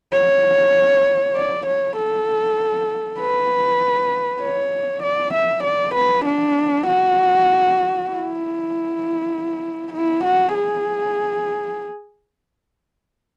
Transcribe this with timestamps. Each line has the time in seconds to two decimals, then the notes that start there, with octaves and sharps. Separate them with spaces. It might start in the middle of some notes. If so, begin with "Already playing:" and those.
0.13 C#5
1.36 D5
1.66 C#5
1.97 A4
3.20 B4
4.42 C#5
5.03 D5
5.34 E5
5.64 D5
5.95 B4
6.25 D4
6.87 F#4
8.10 E4
9.93 E4
10.25 F#4
10.54 G#4